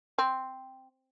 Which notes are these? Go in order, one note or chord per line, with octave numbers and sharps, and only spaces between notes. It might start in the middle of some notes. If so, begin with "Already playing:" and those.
C4